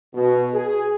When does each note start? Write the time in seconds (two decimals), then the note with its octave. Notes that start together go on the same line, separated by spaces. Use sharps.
0.15 B2
0.54 G#4